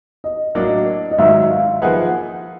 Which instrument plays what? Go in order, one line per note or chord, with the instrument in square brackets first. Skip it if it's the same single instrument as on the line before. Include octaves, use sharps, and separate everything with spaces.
[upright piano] D#5
[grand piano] A2 F#3 A#3 D4 [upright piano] D#5
[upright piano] D#5
[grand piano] G#2 D#3 F#3 [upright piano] E5
[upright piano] F5
[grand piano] F3 A#3 D#4 G#4 B4 [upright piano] F#5